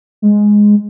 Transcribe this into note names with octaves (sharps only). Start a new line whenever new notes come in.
G#3